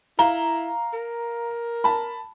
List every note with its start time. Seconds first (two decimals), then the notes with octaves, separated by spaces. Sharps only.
0.19 E4 F5 A#5 G7
0.93 A#4
1.84 A5 B5